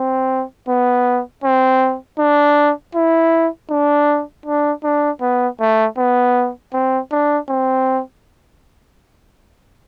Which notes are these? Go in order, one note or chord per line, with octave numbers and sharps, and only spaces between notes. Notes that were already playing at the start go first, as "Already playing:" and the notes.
Already playing: C4
B3
C4
D4
E4
D4
D4
D4
B3
A3
B3
C4
D4
C4